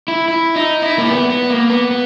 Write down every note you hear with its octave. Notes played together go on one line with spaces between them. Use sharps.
E4
E4
D#4
E4
A#3
B3
B3
A#3
B3
B3